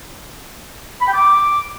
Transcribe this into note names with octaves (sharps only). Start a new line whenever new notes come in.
B5
G5
D6